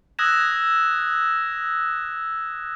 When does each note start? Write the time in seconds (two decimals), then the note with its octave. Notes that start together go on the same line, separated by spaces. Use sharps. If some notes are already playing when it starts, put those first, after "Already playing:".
0.19 D#6 E6 F#6 G#6 A#6 E7